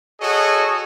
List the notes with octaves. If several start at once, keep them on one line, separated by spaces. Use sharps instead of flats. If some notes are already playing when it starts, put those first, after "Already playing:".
F#4 G#4 A4 C#5 D#5